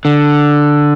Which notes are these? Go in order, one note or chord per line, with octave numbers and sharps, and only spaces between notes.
D3